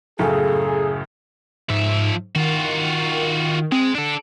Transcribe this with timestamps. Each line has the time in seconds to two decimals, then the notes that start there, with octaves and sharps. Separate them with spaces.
0.19 F#2 A2 C#3 G#4 A4
1.70 G#2 F3 E5
2.35 D#3 F4 F#4
3.72 G#3 C4
3.95 D4 A4 D7